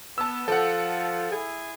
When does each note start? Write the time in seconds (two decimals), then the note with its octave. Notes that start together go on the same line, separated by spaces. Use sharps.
0.18 B3 A5 E6
0.48 F3 A4 F#5
1.32 E4 G#4